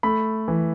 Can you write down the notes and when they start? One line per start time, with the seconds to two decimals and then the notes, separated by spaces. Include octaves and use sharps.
0.03 A3 B5
0.48 E3